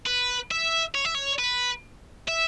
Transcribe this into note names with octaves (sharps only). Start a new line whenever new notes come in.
B4
E5
C#5
E5
C#5
B4
E5